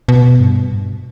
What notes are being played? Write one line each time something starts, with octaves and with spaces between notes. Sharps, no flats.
B2
G2